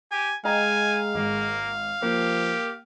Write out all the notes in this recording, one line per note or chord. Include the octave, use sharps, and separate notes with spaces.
G4 G#5
G#3 D#5 F5 G5 G#5 A#5
G#1 A#3
F3 A#3 G4